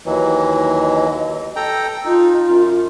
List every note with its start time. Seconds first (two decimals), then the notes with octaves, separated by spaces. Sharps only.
0.06 D#2 E3 F#3 D#5
1.56 A4 G5 A#5
2.05 D#4 F4
2.49 F#2